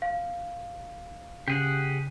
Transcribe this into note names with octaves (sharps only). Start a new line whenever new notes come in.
F5
C#3 G4 G#4 F#5